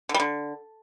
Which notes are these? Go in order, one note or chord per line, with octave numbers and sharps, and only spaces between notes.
D3
G3
D3